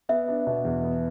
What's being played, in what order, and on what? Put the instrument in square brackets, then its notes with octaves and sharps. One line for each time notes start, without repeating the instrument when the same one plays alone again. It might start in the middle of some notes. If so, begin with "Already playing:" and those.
[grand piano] B3 [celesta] E5
[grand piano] D4
B2
E2
B3